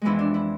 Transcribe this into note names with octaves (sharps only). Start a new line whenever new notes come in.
F2 E3 G#3 B3 E4
D4
E4